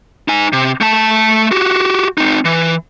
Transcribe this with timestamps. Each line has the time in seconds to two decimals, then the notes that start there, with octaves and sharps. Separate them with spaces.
0.28 D#4 G#5
0.53 C3
0.81 A3 A5
1.51 F#4 G4
2.18 C4 D#4
2.45 E3